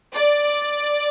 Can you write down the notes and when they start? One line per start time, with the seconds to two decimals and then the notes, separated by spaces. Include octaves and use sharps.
0.14 D5